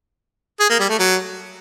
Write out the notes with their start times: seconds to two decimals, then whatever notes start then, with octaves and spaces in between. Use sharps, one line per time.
0.60 G#4
0.70 A#3
0.80 G3
0.89 A3
0.99 F#3